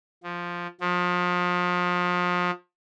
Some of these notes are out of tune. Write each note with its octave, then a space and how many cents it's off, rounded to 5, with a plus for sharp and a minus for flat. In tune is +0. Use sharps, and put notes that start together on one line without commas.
F3 +0
F3 +30